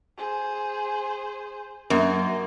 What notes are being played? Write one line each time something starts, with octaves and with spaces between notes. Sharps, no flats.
G#4 C5
F#2 A#3 D#5